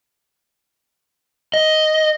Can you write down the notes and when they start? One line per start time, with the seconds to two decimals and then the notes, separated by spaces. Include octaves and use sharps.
1.54 D#5